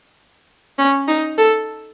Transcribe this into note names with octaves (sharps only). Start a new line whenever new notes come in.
C#4
D#4
A4